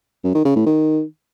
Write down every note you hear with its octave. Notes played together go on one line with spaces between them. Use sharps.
F#2
D#3
C#3
A2
D#3